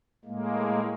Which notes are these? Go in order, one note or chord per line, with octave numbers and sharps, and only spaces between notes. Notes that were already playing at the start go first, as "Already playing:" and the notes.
A2 G#3 A#3